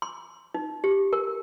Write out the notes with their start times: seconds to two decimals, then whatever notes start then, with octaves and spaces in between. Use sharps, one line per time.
0.02 C6
0.54 D#4
0.84 G4
1.13 A#4